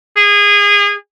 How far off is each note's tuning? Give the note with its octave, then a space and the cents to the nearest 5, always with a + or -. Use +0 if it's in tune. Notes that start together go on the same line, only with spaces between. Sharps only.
G#4 -25